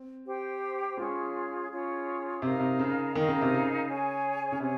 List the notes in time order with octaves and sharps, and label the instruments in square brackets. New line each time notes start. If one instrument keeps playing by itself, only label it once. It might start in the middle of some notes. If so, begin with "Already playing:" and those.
Already playing: [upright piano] C4
[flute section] G4 C5 G5
[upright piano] G#3 [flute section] C#4 F4 G#4 C#5
[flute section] C#4 F4 G#4 C#5
[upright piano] C3 [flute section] D#4 A#4 F5 A#5
[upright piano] C3
C#3
[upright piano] D#3 [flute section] D#4 A#4 F5 A#5
[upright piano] C#3
C3
C#3
[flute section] G#4 C#5 G#5
[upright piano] C#3
[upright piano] C3 [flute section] G#4 C#5